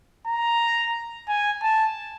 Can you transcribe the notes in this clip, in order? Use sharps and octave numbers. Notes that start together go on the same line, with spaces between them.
A#5
G#5
A5